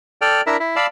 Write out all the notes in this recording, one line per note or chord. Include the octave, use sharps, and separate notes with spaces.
A4 D5 G5 F6
D4 E4 A#4 E5
E4
D5 F5 A5 B5 E6